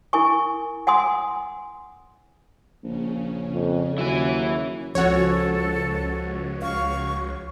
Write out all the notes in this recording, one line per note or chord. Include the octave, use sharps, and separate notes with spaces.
E4 A#4 G#5 C#6
F#5 G#5 C6 D#6
A#1 C#3 C#4
F2
D#2 F#3 E4 G#5
C#2 F3 C#4 F#4 A4 C#5
F5 C#6